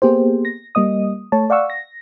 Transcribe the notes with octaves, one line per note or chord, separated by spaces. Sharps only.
A#3 B3 G4 G#4 C5
A#6
G3 A#3 D#5 D#6
A3 C#5 A5
D5 F5 F#5 C#6 E6
A#6